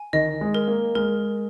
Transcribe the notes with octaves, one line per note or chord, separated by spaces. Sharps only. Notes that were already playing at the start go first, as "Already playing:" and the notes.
Already playing: G#5
D#3 D#5
G#3
A#4
A#3
G#3 A#4